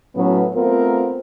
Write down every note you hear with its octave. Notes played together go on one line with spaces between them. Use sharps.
A2 F#3 B3 C#4
A3 B3 C4 F4 A#4